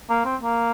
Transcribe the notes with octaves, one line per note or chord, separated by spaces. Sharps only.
A#3
C4
A#3